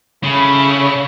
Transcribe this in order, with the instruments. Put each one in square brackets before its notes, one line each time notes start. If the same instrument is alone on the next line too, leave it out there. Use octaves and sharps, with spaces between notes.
[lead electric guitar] C#3 [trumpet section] A3 E4 B5